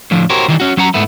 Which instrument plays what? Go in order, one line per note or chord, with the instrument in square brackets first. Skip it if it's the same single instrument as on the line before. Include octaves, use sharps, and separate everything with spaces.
[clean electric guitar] A2 D3 F3
F#4 G4 A#4 C5 C#5
D#3 E3 G3
C#4 F#4
F#3 C#4 F#5 A#5
G#2 A3 B3 E4